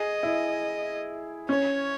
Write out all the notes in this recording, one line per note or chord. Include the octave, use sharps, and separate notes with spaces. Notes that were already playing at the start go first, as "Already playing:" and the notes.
Already playing: G#4 D#5
E4
C#4 C#5